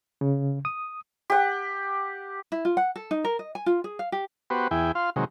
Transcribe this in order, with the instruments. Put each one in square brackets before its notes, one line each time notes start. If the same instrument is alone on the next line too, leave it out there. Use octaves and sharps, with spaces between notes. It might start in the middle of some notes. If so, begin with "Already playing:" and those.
[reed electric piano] C#3
D#6
[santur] G4 F#5
[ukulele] E4
F4
F#5
A4
D#4
A#4
D#5
G#5
F4
G#4
F5
G4
[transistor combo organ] B3 F#4 G4 B4 C5
E2 E4 G#4 G5
F4 F5 C6
C3 D#3 F#3 G#3